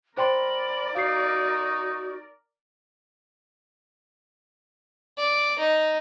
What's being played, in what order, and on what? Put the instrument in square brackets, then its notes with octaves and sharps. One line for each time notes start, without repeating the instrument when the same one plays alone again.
[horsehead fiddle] A#4 D5 [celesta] C5 G5 C6 [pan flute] B5
[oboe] D#4 [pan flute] F#4 [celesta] F5 C7
[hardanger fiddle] D5
D#4